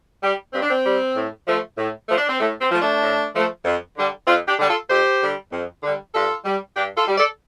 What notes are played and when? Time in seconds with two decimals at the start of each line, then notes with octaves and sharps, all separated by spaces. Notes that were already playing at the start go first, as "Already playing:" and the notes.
0.22 G3
0.53 G2 C4
0.63 D4
0.71 C4
0.85 G3
1.16 A2
1.47 F3 A3
1.78 A2
2.09 F3 A3
2.18 D4
2.29 C4
2.41 A2 A3
2.61 C4
2.71 F3 A3
2.82 A3 D4
3.03 A2
3.34 F3 A3
3.65 F2
3.97 D3 G3
4.27 F2 C4 F4
4.48 D4 G4
4.59 D3 G3
4.69 F4 A4
4.90 F2 G4 C5
5.22 D3 G3
5.53 F2
5.83 D3 G3
6.14 G2 F4 A4
6.45 G3
6.77 G2 D4 G4
6.97 F4 A4
7.08 G3
7.18 A4 D5